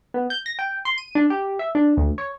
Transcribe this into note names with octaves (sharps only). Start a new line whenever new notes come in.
B3
G6
A#6
G5
C6
D#7
D4
G4
E5
D4
D2
C#5